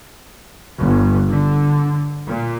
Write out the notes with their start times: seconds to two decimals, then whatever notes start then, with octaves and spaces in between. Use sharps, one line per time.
0.77 G1
1.29 D3
2.25 A#2